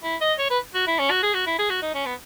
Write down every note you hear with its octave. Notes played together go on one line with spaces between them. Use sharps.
E4
D#5
C#5
B4
F#4
E4
C#4
F#4
G#4
F#4
E4
G#4
F#4
D#4
C#4
B3